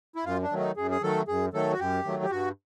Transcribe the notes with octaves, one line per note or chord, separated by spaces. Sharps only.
E4
F#2 F4
D4
D#3 F#3 A3
D#4
F#2 G#4
G#4
D#3 F#3 A3 A4
F#2 G#4
D#3 F#3 A3 A4
F#4
F#2 G4
D#3 F#3 A3
G4
G2 F#4